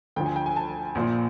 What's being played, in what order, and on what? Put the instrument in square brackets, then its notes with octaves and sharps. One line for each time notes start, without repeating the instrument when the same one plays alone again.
[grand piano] D2 D3 F3 G5
G#5
G5
G#5
A5
A#1 A#2 F3